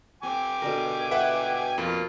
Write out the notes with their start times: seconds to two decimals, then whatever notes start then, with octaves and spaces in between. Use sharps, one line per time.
0.23 C4 G5 G#5 D6
0.62 B2 D3 A#4
1.11 B4 E5 F#5
1.78 F2 A#3 F4 A5